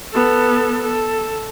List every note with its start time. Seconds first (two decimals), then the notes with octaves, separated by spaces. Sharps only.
0.13 B3 A4
0.82 A4